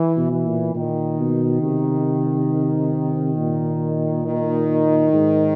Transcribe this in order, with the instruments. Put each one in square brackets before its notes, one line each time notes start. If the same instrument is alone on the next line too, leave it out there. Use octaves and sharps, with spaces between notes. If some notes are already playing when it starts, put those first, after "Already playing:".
Already playing: [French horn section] E3
[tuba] B2
[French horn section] E3
[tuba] A#2
[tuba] A#2 [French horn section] D#3
[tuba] B2
C3
A#2
[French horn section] D#3
[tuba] G#2